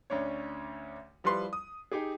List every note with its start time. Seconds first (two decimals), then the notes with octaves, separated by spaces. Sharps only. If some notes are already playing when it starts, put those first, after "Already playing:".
0.10 D2 C#4 D4 C#5
1.24 F3 G3 E4 B4 C6
1.53 D#6
1.92 D#4 G4 G#4